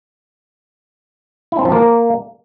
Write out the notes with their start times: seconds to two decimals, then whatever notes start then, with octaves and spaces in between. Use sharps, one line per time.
1.52 E4
1.59 C4
1.65 F3
1.72 A#3